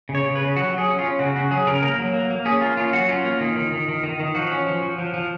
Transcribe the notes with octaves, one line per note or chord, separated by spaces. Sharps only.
C#3
C#5
C#3
B4
C#3
F#3 F#4
F#3
G#4
C#4
C#4 F4
C#3 F#4
C#3 F#4
F#3 G#4
C#3 A#4
A#3 A#4
F#3
A#3
A#3
C#4 G#4
A#3 F4
C#4 F4
F#3 F#4
C#4 F4
A#3
D#3
D#3
D#3
D#3
D#3
D#3
F3 F#4
C#4
F3
F3
F3
F3